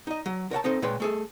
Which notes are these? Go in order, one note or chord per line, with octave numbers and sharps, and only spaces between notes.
D#4 D#5
F#3
A#4 C#5 F#5 A5
C4 D#4 A4 C5
A#2 G#3 B4 C#5 G5 C6
A3 G#4 A4